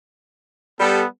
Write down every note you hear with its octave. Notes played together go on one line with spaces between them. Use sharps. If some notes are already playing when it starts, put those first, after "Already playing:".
G3 B3 A4